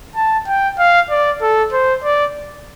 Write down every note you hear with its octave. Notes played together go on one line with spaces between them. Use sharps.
A5
G5
F5
D5
A4
C5
D5